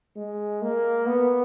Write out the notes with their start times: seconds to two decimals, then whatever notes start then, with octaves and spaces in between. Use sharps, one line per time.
0.16 G#3
0.62 A#3
1.06 B3